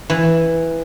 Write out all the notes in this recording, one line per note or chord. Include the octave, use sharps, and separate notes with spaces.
E3